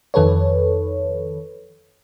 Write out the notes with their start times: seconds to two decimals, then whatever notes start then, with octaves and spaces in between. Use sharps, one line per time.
0.14 F2 D#3 A4 B4 C#5